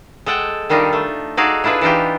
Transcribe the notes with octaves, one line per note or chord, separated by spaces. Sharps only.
G#3 A4 F#5 G5 A5
D#3 G3 D4 D#4 F4
A3
D#4 F#4 G#4 A4 D5 F5
D4 E4 F4 G#4 B4
E3 D4 D#4 F4 G4